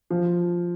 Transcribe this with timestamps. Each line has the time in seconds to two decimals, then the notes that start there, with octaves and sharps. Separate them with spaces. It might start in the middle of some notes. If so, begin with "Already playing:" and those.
0.10 F3